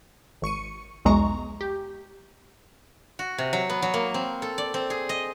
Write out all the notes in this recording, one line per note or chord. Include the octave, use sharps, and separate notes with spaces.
G#1 C#6 C#7 D#7
B1 E2 G#3 A#5 C#6
G4
F#4
C3
F#3
B3
F#3
A#3
C4
A4
D5
C4
G#4
D#5